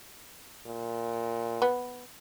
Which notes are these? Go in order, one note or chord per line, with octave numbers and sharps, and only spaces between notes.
A#2
B3